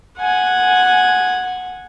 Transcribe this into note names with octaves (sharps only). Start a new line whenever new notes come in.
F#5 G#5